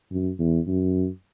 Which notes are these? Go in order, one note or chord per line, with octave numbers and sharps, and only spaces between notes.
F#2
E2
F#2